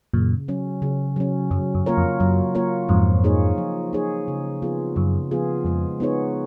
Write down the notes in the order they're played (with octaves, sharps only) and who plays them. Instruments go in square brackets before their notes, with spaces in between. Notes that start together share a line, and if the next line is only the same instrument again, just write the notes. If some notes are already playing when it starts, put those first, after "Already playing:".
[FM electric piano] F#2 A#2 [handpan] C#3
[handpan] F#3 C#4
C#3
F#3 C#4
[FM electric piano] F#2 [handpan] F#3
[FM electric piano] F#2
[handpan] A#3 F4 A#4 C#5
[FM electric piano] F2
[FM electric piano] F#2 [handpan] F#3
[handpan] A#3 F4 A#4 C#5
[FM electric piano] F2 G#2 [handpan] F3
[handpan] A#3 D#4 G#4 C#5
F3
A#3 D#4 G#4 C#5
C#3
F3 B3 F4 G#4
[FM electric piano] F#2 [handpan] C#3
[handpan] F3 B3 F4 G#4
[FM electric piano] F2 [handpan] G#3
[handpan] B3 D#4 G#4 C#5